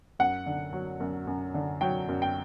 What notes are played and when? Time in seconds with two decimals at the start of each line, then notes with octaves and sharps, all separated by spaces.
0.19 F#2 F#5
0.46 D3
0.73 F#3
1.00 F#2
1.27 F#2
1.54 D3
1.81 F#3 G5
2.08 F#2
2.22 G5